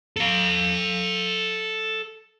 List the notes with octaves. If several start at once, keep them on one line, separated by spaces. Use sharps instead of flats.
A4 F5